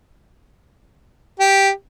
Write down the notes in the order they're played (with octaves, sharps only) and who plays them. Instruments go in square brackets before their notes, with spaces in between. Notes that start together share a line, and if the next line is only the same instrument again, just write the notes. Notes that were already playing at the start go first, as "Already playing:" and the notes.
[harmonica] G4